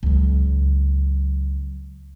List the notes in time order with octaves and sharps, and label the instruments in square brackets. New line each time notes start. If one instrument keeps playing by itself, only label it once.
[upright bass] C#2 F#3